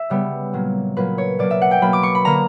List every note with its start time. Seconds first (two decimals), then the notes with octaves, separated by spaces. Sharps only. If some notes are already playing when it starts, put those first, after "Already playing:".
Already playing: E5
0.10 C#3 G3 B3
0.53 A#2 F#3 A#3
0.97 A#2 F#3 A#3 B4
1.18 C#5
1.39 B2 F#3 A#3 D5
1.51 E5
1.61 F#5
1.71 G5
1.81 B2 F#3 A#3 B5
1.93 D6
2.03 C#6
2.15 B5
2.25 D3 A#3 A#5